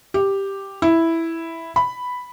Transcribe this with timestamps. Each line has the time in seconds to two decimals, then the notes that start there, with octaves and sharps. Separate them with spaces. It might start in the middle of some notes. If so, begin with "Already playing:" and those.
0.14 G4
0.82 E4
1.76 B5